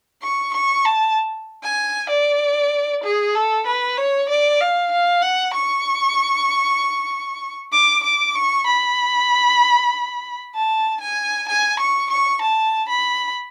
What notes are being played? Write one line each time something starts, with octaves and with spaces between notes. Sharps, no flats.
C#6
C#6
A5
G#5
D5
G#4
A4
B4
C#5
D5
F5
F5
F#5
C#6
D6
D6
C#6
B5
A5
G#5
G#5
C#6
C#6
A5
B5